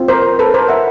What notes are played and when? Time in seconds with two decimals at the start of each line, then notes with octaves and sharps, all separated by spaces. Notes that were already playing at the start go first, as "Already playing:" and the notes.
Already playing: C4 F4
0.08 A#4 C5
0.39 A4 B4
0.54 A#4 C5
0.69 E5 F#5